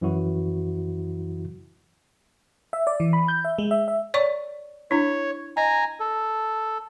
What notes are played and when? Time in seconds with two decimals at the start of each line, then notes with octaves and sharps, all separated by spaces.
0.01 F#2 E3 F#3 E4 F#4
2.73 E5
2.87 D5
3.00 E3
3.13 B5
3.28 G6
3.45 E5
3.58 G#3
3.71 E5
3.88 E5
4.14 C#5 D5 C#6
4.91 D4 E4 C#5
5.57 D#5 G#5 A#5
6.00 A4